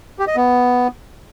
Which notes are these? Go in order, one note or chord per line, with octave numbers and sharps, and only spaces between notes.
G4
D#5
B3